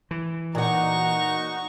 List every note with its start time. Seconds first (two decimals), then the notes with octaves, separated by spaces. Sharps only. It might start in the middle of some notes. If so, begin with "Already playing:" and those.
0.11 E3
0.55 A#2 D#4 F#4 F#5 A#5 C#6